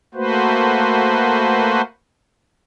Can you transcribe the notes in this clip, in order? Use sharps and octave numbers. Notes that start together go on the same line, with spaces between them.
A3 A#3 F#4 B4 C5